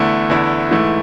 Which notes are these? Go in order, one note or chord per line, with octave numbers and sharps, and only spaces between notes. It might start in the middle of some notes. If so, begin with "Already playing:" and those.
Already playing: E2 D3 A3 E4
E2 D3 A3 E4
G#2 E3 A3 E4